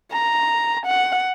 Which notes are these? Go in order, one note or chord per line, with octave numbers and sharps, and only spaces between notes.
A#5
F#5